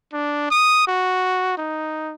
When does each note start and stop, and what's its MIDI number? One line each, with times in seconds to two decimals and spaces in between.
0.13 0.48 62
0.51 0.86 87
0.87 1.55 66
1.57 2.14 63